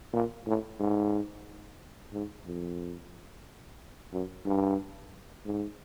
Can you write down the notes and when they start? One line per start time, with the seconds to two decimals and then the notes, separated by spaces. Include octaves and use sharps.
0.13 A#2
0.47 A2
0.80 G#2
2.13 G#2
2.46 F2
4.13 F#2
4.46 G2
5.45 G#2